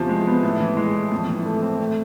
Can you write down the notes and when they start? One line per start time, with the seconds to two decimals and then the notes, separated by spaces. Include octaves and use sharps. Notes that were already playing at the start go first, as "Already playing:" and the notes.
Already playing: E2 C3 F3
0.09 G#3
0.27 B3
0.43 A2
0.60 E3
0.77 G#3
0.94 A2
1.11 F2
1.29 E3
1.46 A3
1.62 C4
1.80 A3